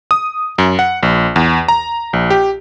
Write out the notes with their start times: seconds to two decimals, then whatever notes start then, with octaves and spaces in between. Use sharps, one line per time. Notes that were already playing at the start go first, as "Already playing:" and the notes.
0.11 D#6
0.58 F#2
0.79 F#5
1.03 A#1
1.36 E2
1.68 A#5
2.13 A#1
2.30 G4